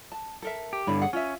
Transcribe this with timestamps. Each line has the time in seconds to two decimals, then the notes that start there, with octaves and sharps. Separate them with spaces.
0.12 A5
0.42 A4 A#4 E5
0.73 G4
0.87 G2 D3 E4 C#5 B5
1.01 C#4 G#4 F#5
1.13 C#4 F4 E5